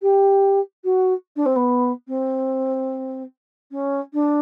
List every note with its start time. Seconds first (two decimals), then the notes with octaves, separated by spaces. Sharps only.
0.02 G4
0.84 F#4
1.36 D4
1.46 C4
1.56 B3
2.08 C4
3.71 C#4
4.13 D4